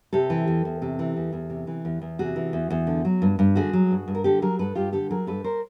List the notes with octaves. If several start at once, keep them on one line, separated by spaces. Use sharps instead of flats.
C3 G4 A4
E3
E2
E2
C3
E3
E2
E2
C3
E3
E2
E2
C3 F#4 G#4
E3
E2
E2
D3
F#3
G2
G2
D3 F#4 G#4
F#3
G2
G2
A#4
D3 G4 A4
F#3 G#4 A#4
G2 A4 B4
G2 F4 G4
D3 G4 A4
F#3 G#4 A#4
G2 A4 B4
A#4 C5